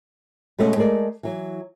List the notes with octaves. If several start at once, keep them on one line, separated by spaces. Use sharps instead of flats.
B2 G#3 A3 C#4 G#4
G#3 A3 G#4 A#4 D5
E3 F#3